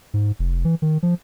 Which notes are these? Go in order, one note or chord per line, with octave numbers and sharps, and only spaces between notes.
G#2
F1
E3
D#3
F3